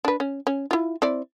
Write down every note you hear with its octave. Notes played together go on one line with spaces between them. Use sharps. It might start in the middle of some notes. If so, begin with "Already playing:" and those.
D4 B4
C#4
C#4
E4 F4
C4 E4 D5